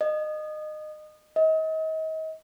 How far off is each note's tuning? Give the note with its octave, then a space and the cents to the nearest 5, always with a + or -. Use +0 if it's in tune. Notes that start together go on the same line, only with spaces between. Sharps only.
D#5 -25
D#5 +35